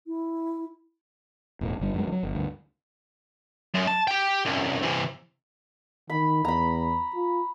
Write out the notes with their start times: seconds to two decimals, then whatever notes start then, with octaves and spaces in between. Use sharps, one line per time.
0.07 E4
1.61 E1 A2
1.80 G1 G3
1.94 F#2 F#3 G#3
2.08 F3 F#3
2.23 G1
2.35 D2 G2
3.75 F#2
3.88 A5
4.08 G4 G5
4.45 C2 F#2
4.82 C3 E3
6.10 D#3 B5
6.45 E2 A#5 B5
7.15 F4